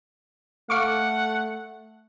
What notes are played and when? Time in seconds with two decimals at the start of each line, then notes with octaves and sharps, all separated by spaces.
0.70 A3 F5 F#5 C#6 D6